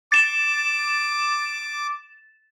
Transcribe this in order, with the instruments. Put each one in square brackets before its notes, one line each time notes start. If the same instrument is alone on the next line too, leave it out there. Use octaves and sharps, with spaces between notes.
[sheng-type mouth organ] D6 [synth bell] A6 E7